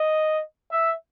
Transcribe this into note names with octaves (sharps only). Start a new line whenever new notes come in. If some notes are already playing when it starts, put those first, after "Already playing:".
Already playing: D#5
E5